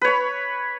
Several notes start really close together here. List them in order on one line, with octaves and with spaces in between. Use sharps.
B4 C#5 B5